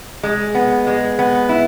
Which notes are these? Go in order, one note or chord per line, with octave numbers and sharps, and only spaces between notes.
G#3
B3
G#3
B3
E4